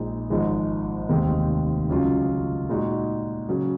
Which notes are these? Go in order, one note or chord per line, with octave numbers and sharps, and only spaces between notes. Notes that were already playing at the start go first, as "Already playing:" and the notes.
Already playing: A#1 A#2 G#3 D#4
G#1 G#2 F3 G#3 D#4
F1 D#2 D#3 G#3 C4
C#2 C#3 F#3 C#4 F4
A#2 G#3 D#4 F#4
C#3 F#3 C#4